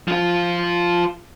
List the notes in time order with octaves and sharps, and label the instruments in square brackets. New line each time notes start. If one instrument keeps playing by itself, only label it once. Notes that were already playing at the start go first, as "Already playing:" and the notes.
[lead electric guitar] F3 F4